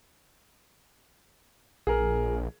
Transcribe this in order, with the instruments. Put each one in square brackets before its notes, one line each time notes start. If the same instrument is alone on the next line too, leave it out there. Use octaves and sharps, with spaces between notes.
[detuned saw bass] A#1 [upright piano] G#4 A#4